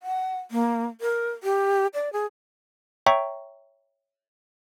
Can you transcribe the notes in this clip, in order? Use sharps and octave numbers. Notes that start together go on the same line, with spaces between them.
F#5
A#3
A#4
G4
D5
G#4
C#5 E5 G5 A#5 C#6